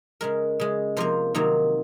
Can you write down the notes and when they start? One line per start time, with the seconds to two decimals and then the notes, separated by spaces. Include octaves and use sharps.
0.21 C#3 G#3 A#4
0.60 C#3 G#3
0.97 C3 F3 A#3 C5
1.35 C3 D#3 F#3 A#3